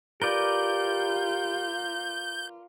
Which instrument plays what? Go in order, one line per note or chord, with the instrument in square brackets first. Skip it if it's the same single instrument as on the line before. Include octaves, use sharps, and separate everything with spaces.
[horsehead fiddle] F4 [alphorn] G4 [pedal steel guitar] A#4 B4 D5 [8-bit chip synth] G6